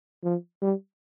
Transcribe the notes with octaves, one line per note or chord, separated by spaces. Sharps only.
F3
G3